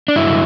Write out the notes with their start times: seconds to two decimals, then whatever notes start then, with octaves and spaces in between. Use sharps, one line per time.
0.08 D4
0.16 G2 D3 F#3 E4